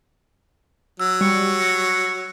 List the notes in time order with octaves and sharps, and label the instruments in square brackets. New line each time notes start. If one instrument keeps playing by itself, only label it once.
[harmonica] F#3 [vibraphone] E6
[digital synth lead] G3 [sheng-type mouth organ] C#6
[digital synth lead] A#6